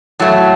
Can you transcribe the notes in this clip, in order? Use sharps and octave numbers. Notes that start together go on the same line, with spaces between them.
A2 F#3 A3